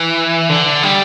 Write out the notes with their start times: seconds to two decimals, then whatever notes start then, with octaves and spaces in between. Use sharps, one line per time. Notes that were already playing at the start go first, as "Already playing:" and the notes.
Already playing: E3
0.49 D3
0.83 G3